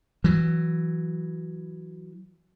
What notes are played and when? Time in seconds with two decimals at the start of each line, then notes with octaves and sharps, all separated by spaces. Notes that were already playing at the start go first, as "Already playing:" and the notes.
0.24 E3 F#3